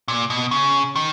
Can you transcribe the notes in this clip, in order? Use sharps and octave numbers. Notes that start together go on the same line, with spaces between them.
A#2
B2
C#3
D#3